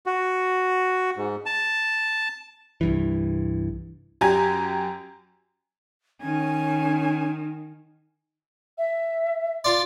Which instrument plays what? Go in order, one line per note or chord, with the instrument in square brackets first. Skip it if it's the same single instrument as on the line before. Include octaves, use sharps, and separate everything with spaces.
[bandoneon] F#4
G#2
A5
[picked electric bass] C2 G2 E3
[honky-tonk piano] F#2 G4 G#5 A#5 G#6
[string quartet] D#3 [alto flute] C#4 [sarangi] G#5
[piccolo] E5
[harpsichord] F4 D5 [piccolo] C6